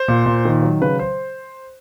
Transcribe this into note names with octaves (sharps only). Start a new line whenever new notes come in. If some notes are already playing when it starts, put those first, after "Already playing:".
Already playing: C5
A#2
A#2
D#3
F#3
C#3 B4
C5